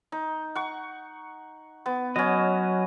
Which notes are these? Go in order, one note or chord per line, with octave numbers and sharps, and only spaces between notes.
D#4
F#5 C#6
B3
F#3 C#4 B4 D#5